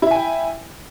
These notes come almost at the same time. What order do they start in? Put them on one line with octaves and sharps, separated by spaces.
E4 E5 G#5 G5